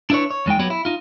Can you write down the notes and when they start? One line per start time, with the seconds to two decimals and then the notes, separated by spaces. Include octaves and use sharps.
0.10 D4 E4 B4 C#5
0.31 C#5
0.46 E2 G#3 D#4 G5
0.59 F#3 B3 G4 C#5
0.70 E4
0.85 D#4 F4